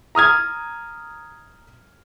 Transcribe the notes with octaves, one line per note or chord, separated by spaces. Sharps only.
A#5 D#6 F6 G#6